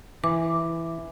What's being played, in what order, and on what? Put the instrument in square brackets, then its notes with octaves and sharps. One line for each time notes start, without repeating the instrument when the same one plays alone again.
[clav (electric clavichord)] E3 [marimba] D6